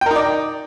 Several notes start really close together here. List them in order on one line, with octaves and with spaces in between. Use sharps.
G5 A#4 D#4 D5